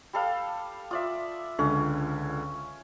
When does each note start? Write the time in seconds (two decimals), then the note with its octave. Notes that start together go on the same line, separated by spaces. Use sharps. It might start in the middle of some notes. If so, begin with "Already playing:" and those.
0.13 G3 A4 F5
0.91 F4 D5 E5 D#6
1.59 C#2 D3 C#4